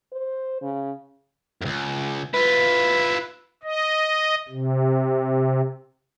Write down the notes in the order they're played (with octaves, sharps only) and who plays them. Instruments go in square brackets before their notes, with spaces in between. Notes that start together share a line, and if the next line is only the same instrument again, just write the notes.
[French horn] C5
C#3
[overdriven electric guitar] C#2 F#2
[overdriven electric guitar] E4 F4 [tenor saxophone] B4
[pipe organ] D#5
C3